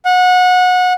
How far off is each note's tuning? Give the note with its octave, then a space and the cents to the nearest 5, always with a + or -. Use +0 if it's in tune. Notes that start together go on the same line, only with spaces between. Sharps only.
F#5 -25